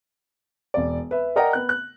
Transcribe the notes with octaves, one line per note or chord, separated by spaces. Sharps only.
E1 D5
B4 E5
A#4 D5 D#5 F#5 G5 A#5
B3 F#6
F#6